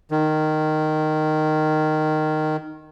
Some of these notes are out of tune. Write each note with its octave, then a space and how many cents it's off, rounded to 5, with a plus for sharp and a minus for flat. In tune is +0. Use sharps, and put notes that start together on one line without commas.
D#3 -10